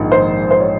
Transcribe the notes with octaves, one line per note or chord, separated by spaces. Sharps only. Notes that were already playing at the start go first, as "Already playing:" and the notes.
Already playing: A#1 G#2 D#3
C5
C5
C#5